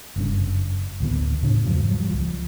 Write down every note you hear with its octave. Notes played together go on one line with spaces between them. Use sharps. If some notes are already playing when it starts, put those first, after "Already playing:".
F#1 G2 C#3
A1 D2 D#3 B3
A2 C#3 D4
E2 G#2 F3 F#3
F3 G3
C#2 F3